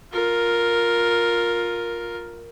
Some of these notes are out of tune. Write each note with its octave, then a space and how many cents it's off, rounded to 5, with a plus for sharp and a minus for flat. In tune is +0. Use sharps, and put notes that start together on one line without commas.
F4 +15 A#4 +0